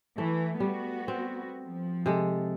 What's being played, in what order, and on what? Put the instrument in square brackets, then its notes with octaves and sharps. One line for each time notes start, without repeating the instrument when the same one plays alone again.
[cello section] E3 [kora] A3
[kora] G3 [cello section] B3 F#4
[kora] C4
[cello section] F3
[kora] C3 G#3 A4